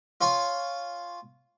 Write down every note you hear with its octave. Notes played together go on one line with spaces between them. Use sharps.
F4 C#5 G#5